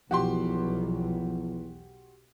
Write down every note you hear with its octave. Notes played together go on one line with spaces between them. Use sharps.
B1 E2 F3 F#4 G4 C6